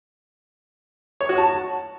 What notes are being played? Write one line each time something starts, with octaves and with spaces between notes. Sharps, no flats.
C#5
F#4
A5